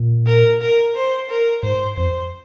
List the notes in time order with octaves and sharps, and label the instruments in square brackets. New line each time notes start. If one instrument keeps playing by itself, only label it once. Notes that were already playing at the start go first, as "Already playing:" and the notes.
Already playing: [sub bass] A#2
[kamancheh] A#4
A#4
C5
A#4
[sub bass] G#2 [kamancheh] C5
[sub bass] F2 [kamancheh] C5